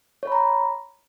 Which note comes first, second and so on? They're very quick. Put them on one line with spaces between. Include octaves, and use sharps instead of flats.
C#5 B5 A#5